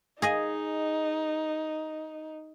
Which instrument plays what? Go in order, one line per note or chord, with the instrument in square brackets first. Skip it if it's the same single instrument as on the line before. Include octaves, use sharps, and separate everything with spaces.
[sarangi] D#4 [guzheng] G#4 D#5 G#5